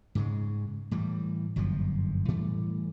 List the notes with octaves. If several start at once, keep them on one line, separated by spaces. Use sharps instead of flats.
G#2 C#3 G#3
A2 E3 G3
G1 F#2 A#2 F3
A2 E3 G3 A3